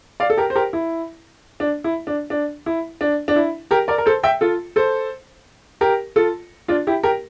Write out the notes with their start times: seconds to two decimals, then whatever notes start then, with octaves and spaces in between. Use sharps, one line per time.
0.20 D5 F5
0.30 A4
0.37 G4 A#4
0.50 C5
0.55 G4 A#4
0.73 E4
1.60 D4
1.84 E4
2.07 D4
2.30 D4
2.66 E4
3.01 D4
3.28 D4
3.36 E4
3.71 G4 A#4
3.88 A#4 D5
3.98 A#4
4.06 A4 C5
4.23 E5 G5
4.41 F4 A4
4.76 A4 C5
5.81 G4 A#4
6.16 F4 A4
6.68 D4 F4
6.87 E4 G4
7.03 G4 A#4